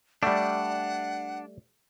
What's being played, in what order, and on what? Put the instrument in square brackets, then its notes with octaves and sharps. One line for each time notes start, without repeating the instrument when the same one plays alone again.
[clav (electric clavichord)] G3 A3 [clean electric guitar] D4 [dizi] F#5